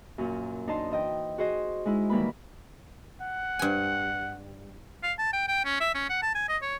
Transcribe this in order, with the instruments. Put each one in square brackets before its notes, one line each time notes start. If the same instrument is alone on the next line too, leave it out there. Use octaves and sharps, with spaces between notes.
[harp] F#2 A#2
D4 D#4 C5 D#5 A5 C6
E3 D#5 G5
F#4 G#4 C5 D#5
G#3 D#4 E4
D#3 E3 G3 A#3 B4 B5
[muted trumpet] F#5
[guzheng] G2 G#5
[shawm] F5
A5
G5
G5
C#4
E5
C#4
F#5
A5
G#5
D#5
C#5